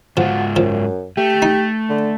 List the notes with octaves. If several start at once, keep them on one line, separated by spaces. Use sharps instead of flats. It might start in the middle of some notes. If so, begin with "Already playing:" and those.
G#2 F3 F4 F#4
F#2 F3
A3 G4
D#4
D3